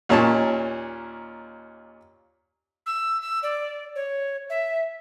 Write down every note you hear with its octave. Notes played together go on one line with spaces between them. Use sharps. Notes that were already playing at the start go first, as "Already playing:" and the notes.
D#2 A#2 C#4 C#5 A5
E6
E6
D5
C#5
E5